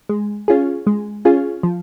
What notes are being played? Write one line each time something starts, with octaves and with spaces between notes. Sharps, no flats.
G#3
C#4 F4 G#4
G#3
C#4 F4 G#4
F3